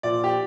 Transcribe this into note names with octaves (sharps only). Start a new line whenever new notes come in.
A#2 F3 D5
G4